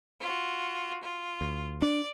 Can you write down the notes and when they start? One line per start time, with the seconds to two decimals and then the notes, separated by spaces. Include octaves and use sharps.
0.21 F4 F#4
1.03 F4
1.41 D2
1.82 D4 D5